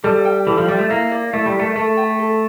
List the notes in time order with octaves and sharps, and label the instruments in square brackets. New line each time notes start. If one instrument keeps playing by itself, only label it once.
[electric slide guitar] G3 [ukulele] A4
[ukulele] G5
[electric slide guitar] E3 [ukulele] A4
[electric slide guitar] F3
[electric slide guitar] G3 [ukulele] E5
[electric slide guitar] A3
[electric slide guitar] A#3 [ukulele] E4
[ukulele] D5
[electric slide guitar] A3 [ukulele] E4
[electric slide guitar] G3
[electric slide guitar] A3 [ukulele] A#4
[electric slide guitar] A3 [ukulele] A4
[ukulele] G5
A4